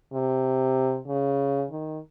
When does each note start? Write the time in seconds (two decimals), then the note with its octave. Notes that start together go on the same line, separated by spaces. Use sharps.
0.13 C3
1.08 C#3
1.71 D#3